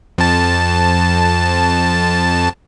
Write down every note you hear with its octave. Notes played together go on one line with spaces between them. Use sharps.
F2 A5